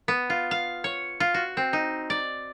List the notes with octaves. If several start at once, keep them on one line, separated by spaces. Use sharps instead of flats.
B3
F4
F5
C#5
F4
F#4
C4
D#4
D5